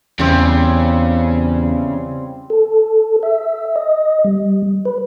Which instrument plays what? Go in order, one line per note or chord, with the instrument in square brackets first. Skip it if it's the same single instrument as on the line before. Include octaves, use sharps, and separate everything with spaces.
[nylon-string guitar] E2 [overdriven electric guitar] C#3 [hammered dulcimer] G3 C4
[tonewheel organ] A4
E5
D#5
G3
B4